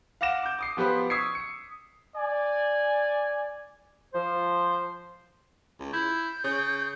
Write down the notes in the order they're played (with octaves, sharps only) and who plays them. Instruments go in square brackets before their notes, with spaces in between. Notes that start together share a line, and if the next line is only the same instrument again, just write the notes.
[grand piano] F5 F#5 D6 A#6 E7
D6 G6
D6 D#6 C7
F3 B3 G4 B4 C5
C#6 D#6 E6 G#6 B6 C7
C#7
[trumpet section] D5 G#5
[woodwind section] F3 C5
[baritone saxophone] C#2
[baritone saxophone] E4 [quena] G6
[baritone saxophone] C#3